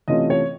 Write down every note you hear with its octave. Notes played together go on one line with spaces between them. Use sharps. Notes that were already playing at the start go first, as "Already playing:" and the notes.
C3 E3 A3 C#4 F4 D#5
C#5